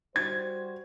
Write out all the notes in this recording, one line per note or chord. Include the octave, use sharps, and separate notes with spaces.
G3 F#4 C5 G#6